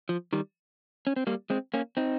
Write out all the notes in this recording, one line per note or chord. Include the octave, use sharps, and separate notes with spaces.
F3
D#3 G3
C#4
C4
G3 A#3
G#3 C4
A#3 C#4
C4 D#4